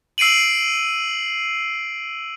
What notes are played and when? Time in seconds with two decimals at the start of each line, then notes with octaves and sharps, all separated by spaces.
0.18 E6 C7 D7 D#7 F#7